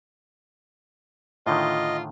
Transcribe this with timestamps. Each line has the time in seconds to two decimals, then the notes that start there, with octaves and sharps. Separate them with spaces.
1.47 A2 D3 D#3 F4 D#5